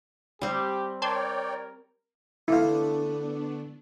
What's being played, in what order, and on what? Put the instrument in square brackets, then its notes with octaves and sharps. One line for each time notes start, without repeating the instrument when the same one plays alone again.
[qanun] G3 C4 [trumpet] G4
[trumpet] A#4 [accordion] C#5 D5 G5 [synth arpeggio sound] A5 C6 G#6
[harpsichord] D3 A3 [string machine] B3 D4 [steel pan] E4 F5